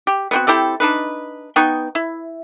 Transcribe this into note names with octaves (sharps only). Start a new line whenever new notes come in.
G4
B3 C4 F#4
C4 E4 G4 A4
D4 D#4 B4
B3 D#4 G5 C#6
E4